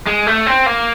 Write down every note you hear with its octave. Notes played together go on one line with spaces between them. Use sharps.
G#3
A3
C4
A#3